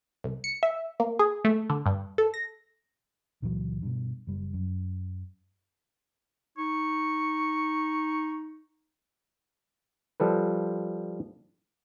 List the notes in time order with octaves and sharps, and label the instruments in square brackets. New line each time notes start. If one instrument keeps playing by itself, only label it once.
[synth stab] C2
C#7
E5
A#3
G#4
A3
D3
G2
A4
A#6
[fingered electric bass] C#2 A#2 E3 F#3
G2 B2
F#1 G3
F#2
[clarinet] D#4 [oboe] C#6
[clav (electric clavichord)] F3 G3 A4 B4